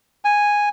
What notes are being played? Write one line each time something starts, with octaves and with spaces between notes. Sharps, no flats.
G#5